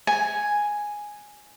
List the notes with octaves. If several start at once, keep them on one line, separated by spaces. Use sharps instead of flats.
G#5